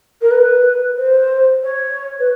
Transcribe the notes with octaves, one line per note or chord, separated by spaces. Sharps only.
A#4
B4
C5
C#5
B4